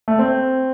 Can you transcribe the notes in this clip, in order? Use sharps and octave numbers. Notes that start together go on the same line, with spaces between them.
A3
C4